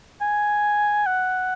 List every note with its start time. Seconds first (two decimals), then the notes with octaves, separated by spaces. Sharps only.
0.21 G#5
1.07 F#5